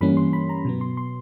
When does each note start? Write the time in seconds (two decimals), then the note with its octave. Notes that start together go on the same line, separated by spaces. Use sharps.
0.01 G2 E3 G3 A#3 C#4 B5
0.17 C6
0.33 B5
0.49 A#5
0.65 B2 F#3 B3
0.81 C6
0.97 C6